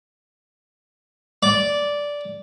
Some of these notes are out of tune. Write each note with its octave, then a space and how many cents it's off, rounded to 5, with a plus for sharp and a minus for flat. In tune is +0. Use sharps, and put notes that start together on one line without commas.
D5 -10